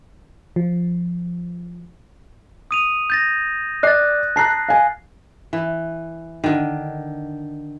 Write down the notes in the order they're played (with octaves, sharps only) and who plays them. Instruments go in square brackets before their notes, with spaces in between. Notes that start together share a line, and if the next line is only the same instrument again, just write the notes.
[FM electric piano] F3
[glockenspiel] D#6 D#7 F7
G6 A6 A#6
[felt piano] D5 C7 [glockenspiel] F#6 A6
[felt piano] A5 A#5 F#6 [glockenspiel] A#6 C7
[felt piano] F5 G#5
[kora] E3
D3 D#3